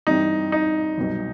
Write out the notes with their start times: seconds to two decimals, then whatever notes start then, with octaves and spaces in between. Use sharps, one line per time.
0.07 G2 E3 G3 C4 D#4
0.52 D#4
0.97 C2 B2 F#3